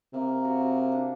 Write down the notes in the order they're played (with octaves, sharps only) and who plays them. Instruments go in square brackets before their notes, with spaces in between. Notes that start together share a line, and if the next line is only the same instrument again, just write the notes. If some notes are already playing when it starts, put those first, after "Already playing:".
[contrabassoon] C3 [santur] A#3
[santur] A#3
F#4
F#4
A#3
D4